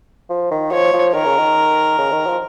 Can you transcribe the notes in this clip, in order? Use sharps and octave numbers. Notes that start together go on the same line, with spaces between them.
F3
D#3
F3 C#5
F3
D#3 A#4
C#3
D#3
C#3
D#3
F3